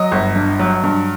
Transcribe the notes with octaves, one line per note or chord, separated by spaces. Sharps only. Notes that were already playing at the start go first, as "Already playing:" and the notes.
Already playing: F#3 D#5
G1
G2
F#3
G2